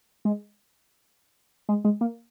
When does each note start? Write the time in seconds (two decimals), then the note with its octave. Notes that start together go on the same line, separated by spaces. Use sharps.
0.25 G#3
1.69 G#3
1.85 G#3
2.01 A#3